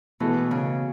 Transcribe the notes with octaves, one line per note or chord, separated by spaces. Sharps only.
B2 E3 A3 E4 A4
C#3